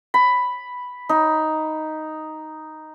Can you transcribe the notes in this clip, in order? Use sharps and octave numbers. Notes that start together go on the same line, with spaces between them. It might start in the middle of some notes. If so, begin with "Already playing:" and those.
B5
D#4